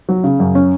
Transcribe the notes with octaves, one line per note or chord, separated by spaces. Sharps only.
F#3
C#3
F#2
C#4